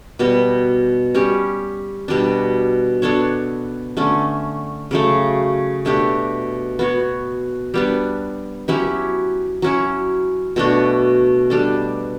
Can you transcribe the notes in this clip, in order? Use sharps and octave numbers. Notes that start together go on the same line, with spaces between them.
B2 G3 B3
G3 C#4 G4
B2 G3 D4
B3 D4 A4 C#5
D3 A3 C#4
C#3 F#3 A3
B2 A3 D4 G4
B3 F#4 C#5
G3 B3 D4
F#3 C#4 E4 G4
F#3 C#4 E4
B2 A3 D4 F#4
G3 D4 A4